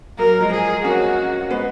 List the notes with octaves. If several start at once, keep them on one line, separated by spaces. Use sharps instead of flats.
F#3 A#3 A#4
F3 G#3
G#4
A#3 C#4 F#4
G#3 B3